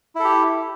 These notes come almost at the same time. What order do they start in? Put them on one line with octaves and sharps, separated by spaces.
E4 A4 G4